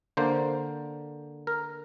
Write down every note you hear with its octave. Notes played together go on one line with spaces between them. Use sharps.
D3 A#3 C5
A#4